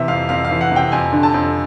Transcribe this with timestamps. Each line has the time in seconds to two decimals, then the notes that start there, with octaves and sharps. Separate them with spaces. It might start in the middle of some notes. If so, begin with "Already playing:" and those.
Already playing: C3 E3 E5
0.08 F2 F5
0.29 F2 F5
0.45 F5
0.51 E3
0.61 F#5
0.71 C3 G5
0.92 F2 G#5
1.13 D3
1.23 A5
1.34 F2